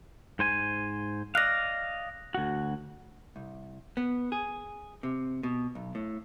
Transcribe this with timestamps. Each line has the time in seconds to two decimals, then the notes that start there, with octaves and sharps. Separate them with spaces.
0.39 G#2 C5 G#5
1.35 D5 D#5 F5 F#6 A#6
2.34 D2 F#4
3.36 C2
3.97 B3
4.32 G#4
5.03 C3
5.43 B2
5.75 B1
5.95 A2